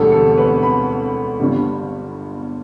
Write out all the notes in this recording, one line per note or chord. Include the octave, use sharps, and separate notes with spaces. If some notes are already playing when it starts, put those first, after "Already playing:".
Already playing: E1 D2 D3 G3 A4
A4
B4
B5
G1 G2 D3 G3